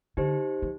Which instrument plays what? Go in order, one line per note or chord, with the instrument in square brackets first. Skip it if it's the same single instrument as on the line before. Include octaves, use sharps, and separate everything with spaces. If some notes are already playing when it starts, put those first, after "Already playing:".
[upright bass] D3 [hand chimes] D#4 G4 C5
[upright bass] E3